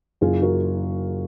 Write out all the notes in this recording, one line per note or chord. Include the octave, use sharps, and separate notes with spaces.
F#1 F4 G#4
F#4 A#4